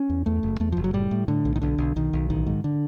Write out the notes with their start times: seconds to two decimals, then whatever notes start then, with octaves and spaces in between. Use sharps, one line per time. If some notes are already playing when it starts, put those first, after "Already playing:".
Already playing: C#4
0.10 E2
0.26 E2 A3
0.43 F#1
0.60 E2 A3
0.72 F#1 F3
0.84 F#3
0.93 A2 G3
1.11 A2
1.28 A2 D3
1.45 B1
1.56 D#3
1.62 B1 D3
1.78 B1
1.96 B1 D#3
2.13 B1
2.30 A1 D#3
2.47 G#2
2.64 D3